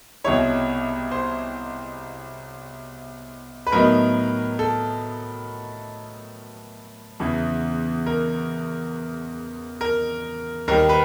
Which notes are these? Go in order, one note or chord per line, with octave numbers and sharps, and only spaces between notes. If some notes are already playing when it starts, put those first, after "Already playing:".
C2 B2 G#3 C4 E4 C#5
C5
B4
A2 F#3 B3 D#4 A#4
A4
E2 C#3 E3
A#4
A#4
D#2 D#3 G3 A#4
B4